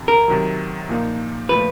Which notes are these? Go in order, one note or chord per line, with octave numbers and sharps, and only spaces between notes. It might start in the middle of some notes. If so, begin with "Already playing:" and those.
Already playing: F2 C3 D#3
A#4
C3 D#3 F#3
A#2 F3 A#3 D#4
A#2 F3 A3 B4